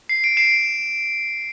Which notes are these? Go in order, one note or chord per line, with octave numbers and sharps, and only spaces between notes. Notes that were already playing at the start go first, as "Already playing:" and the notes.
C7
D7
C7 E7